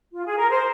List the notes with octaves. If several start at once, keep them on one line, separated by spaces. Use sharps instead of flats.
F4
G#4
A#4
C5